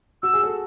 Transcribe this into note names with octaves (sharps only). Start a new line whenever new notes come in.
F#4 E6
G#4
A4